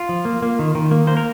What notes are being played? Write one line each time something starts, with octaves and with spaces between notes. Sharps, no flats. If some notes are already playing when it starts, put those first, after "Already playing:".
Already playing: F4
F3
A#3
A#3
D#3
D#3
A#3
A#3 C5
A#4